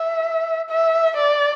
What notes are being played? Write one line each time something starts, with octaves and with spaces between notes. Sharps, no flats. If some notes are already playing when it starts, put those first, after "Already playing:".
Already playing: E5
E5
D5